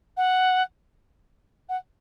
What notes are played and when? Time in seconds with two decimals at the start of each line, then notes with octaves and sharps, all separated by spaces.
0.17 F#5
1.69 F#5